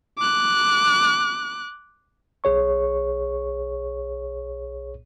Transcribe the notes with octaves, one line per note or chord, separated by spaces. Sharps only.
D6 F#6
B1 G#4 C#5 C#6